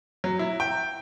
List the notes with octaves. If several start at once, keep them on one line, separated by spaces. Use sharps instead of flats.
F#3
E4
G5